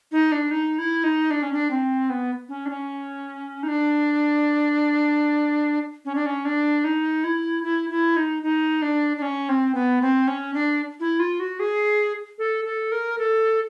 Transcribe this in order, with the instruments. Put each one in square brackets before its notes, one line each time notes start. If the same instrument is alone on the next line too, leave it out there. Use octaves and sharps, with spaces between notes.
[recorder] D#4
D4
D#4
E4
D#4
D4
C#4
D4
C4
B3
C#4
D4
C#4
D#4
D4
C#4
D4
C#4
D4
D#4
E4
E4
E4
D#4
D#4
D4
D4
C#4
C4
B3
C4
C#4
D4
E4
F4
F#4
G#4
A4
A4
A#4
A4